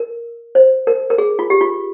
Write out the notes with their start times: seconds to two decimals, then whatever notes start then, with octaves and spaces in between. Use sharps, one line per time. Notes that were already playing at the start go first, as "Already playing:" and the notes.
Already playing: A#4
0.55 C5
0.87 A#4
1.10 A#4
1.18 G#4
1.39 F4
1.50 G4
1.61 F4